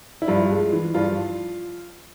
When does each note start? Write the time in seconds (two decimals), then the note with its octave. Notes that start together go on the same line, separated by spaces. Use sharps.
0.22 E4
0.28 G2 F3 F4
0.51 G#3
0.73 E3
0.94 G2 F3 F4